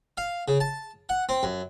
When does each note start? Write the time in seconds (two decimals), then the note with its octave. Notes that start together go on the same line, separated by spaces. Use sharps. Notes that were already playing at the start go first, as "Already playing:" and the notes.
0.17 F5
0.48 C#3
0.60 A5
1.09 F#5
1.29 C4
1.43 F#2